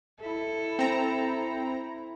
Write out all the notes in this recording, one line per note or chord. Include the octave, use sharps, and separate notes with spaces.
E4 A4
C4 A#5